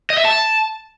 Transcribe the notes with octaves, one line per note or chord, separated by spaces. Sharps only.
D#5
E5
A5